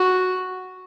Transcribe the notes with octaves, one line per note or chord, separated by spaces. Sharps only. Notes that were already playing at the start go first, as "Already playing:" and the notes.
Already playing: F#4